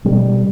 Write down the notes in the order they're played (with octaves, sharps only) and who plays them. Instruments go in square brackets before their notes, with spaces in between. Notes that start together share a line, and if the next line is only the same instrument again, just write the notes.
[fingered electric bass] B2 G3